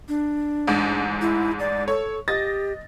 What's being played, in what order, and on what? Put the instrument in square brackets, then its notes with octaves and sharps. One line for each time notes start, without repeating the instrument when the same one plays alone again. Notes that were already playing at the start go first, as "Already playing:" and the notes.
[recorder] D4
[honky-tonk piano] A1 G#2
[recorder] E4
D5
[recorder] A4 [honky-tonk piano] C#5
[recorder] G4 [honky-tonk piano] D#5 A6 A#6